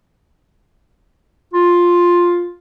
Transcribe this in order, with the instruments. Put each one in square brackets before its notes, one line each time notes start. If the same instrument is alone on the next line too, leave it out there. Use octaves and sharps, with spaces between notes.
[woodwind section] F4